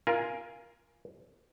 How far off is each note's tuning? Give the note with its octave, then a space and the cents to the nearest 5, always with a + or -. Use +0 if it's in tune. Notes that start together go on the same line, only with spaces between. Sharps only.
F4 -10 A#4 +15 G#5 +0